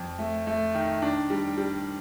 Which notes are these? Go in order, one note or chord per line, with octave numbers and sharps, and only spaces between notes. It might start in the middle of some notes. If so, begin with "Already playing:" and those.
Already playing: F2
A3
A3
D#3
D4
G3
G3